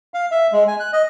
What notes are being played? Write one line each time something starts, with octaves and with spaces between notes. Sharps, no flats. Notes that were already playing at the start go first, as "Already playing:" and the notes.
F5
E5
G#3
G#5
F#6
D#5